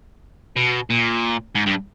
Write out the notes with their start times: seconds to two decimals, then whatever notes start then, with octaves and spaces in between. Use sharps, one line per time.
0.56 B2
0.90 A#2
1.55 G#2
1.66 G2